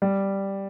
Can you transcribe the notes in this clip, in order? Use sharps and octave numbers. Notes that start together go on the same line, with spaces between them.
G3